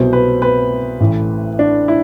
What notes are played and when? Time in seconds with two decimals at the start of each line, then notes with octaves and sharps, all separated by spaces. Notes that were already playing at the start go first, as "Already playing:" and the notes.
Already playing: C2 B2 F#3 C5
0.13 B4
0.42 B4
1.00 A1 A2 E3
1.59 D4
1.88 E4